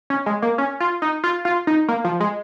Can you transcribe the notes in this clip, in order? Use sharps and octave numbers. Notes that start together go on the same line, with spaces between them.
C#4
G#3
A#3
C#4
F4
D#4
F4
F4
D#4
A#3
F3
G#3